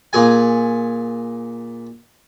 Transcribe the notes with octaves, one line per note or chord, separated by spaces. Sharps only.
A#2 G#4 G#5